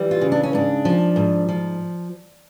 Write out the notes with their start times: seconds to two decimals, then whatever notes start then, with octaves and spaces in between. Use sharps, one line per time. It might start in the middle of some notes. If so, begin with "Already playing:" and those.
Already playing: E3 G3
0.11 F4
0.21 C#3
0.32 D4
0.43 C#4
0.53 G#2 D4
0.85 F3
1.16 G#2
1.49 F3